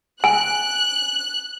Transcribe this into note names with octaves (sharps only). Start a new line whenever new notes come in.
G#5 F#6